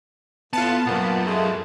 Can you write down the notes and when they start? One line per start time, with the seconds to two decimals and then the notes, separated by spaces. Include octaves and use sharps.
0.53 A2 B3 F4 A5
0.86 B1 F#2 A#2 A#3 B3
1.26 G#3 A3